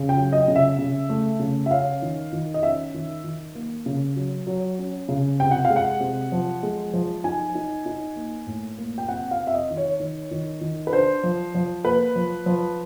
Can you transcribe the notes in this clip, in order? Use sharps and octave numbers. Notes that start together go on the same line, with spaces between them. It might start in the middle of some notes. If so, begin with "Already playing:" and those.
Already playing: C#3
G5
F#3
D#5
C#3
E5
C#3
A3
C#3
E5
C#4 F5
D#3
D#3
D#5
C#4 E5
D#3
D#3
A#3
C#3
F#3
F#3
C#4
C#3
C3 G5
F#5
F5
G#3
F#5
C3
F3
G#3
F3
D#4 G#5
D#4
D#4
A#3
A2
A#3
G5
C4 F#5
F5
C4
E5
D#5
D#3
C#5
D#3
D#3
D#3
B4
D4 C5
F3
F3
A#3 B4
F3
F3